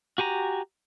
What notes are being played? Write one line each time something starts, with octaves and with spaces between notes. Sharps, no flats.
F#4 G4 G#5 A#5